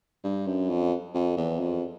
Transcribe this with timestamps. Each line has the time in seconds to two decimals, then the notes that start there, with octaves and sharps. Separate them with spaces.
0.24 G2
0.47 F#2
0.69 F2
1.14 F2
1.37 E2
1.60 F2